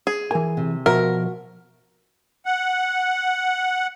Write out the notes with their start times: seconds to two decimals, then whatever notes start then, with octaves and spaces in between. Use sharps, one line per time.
0.07 G#4
0.31 E3 A#4 G#5
0.57 C3
0.86 B2 F3 F#4 A#4 E5
2.46 F#5